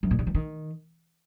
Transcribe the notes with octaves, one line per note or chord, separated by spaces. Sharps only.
F#2
A#2
C3
E3
D#3